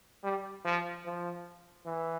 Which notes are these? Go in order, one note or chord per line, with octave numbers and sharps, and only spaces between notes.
G3
F3
F3
E3